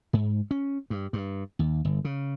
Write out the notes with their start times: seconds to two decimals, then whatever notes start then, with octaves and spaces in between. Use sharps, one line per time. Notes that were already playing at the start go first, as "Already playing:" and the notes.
0.13 G#2
0.51 C#4
0.90 G2
1.13 G2
1.59 D#2
1.85 G1
2.05 C#3